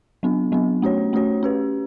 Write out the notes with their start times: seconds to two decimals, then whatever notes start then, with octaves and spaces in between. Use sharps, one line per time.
0.23 F#3 B3 D4
0.52 F#3 B3 D4
0.82 A3 C#4 F#4 C#5
1.13 A3 C#4 F#4 C#5
1.43 C#4 G4 B4